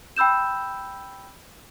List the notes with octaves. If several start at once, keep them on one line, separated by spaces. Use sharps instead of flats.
G5 B5 E6 G6 E7